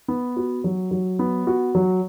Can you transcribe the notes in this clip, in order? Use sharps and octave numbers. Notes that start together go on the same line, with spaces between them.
B3
F#4
F#3
F#3
B3
F#4
F#3